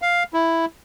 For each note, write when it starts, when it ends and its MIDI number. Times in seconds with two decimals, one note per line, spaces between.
0.02 0.23 77
0.34 0.65 64